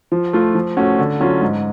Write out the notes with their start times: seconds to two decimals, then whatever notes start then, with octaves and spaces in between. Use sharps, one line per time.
0.12 F3
0.33 A3 F4
0.55 F3
0.77 A3 C#4 F#4
0.99 D3
1.20 F#3 C#4 F4
1.42 G#2